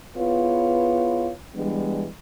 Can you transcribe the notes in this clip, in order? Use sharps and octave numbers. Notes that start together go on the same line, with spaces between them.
B3 E4 F4 G#4 B4 C#5
E3 G3 G#3 B3 D4